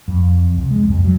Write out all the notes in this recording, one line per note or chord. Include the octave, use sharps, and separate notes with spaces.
F2
C2
G#3
F2
F#3